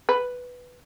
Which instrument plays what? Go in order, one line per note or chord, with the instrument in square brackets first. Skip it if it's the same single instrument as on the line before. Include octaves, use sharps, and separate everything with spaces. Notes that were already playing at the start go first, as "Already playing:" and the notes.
[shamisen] B4